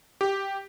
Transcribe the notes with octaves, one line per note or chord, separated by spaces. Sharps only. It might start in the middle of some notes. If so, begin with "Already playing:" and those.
G4